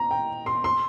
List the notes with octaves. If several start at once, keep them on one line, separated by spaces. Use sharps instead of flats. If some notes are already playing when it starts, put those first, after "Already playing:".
Already playing: A#5
G5
C6
C6